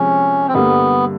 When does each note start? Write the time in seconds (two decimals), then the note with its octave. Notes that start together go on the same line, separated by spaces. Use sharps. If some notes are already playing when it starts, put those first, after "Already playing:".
Already playing: C3 F3 G#3 C#4
0.48 C4
0.53 G2 D3 G3 A#3 B3